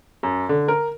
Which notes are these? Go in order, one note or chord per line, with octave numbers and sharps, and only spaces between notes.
F#2
D3
A#4